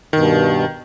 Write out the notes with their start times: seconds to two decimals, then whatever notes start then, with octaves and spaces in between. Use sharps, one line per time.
0.13 G2 B2 D#3